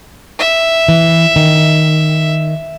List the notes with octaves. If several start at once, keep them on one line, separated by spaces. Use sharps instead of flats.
E5
E3
D#3